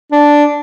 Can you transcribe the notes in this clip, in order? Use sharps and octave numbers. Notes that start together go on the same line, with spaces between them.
D4